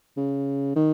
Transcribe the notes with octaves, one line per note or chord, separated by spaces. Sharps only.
C#3
D#3